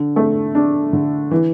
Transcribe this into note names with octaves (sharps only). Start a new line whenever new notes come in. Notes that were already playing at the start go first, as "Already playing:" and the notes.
Already playing: D3
A3
D4
D3
E3